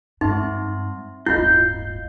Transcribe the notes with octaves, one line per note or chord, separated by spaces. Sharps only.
G2 G#3 C4 D#4 E5 C6
D1 G1 E4 F4 D#5 F5 G6 C7